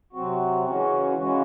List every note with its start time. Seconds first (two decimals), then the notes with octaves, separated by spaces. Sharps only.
0.13 C3 F#3 C4 F#4
0.65 C#3 E3 G#3 C#4 F#4
1.17 C#3 E3 G#3 C#4 F#4